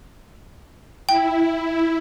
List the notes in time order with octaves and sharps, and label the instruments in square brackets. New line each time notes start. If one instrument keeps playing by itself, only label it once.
[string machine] E4 [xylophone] G5